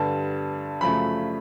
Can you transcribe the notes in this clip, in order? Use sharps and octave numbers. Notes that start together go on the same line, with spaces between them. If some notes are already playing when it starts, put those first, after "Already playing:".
Already playing: G2 D3 G3 B3 A5
F#2 C#3 F3 A3 B5